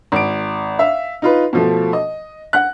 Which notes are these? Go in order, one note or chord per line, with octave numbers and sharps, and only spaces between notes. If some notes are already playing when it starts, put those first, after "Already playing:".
G#1 D7
E5 F5
D#4 F4 B4
B2 F3 A3
D#5
F#5 F#6